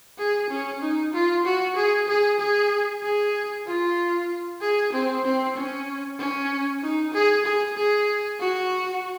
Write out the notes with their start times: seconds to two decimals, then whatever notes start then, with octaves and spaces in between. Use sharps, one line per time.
0.18 G#4
0.50 C#4
0.81 D#4
1.13 F4
1.45 F#4
1.76 G#4
2.08 G#4
2.39 G#4
3.03 G#4
3.66 F4
4.61 G#4
4.92 C4
5.24 C4
5.55 C#4
6.19 C#4
6.82 D#4
7.13 G#4
7.45 G#4
7.77 G#4
8.40 F#4